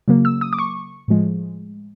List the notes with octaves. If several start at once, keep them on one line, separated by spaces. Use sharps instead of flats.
C#3 F#3 A#3
E6
D#6
D6
C#6
A2 F3 G#3